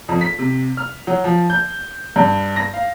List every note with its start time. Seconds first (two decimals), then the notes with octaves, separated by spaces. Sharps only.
0.08 F2
0.21 B6
0.39 C3
0.77 F6
1.07 F#3
1.24 F3
1.50 G6
2.16 G2
2.56 A#6
2.74 F5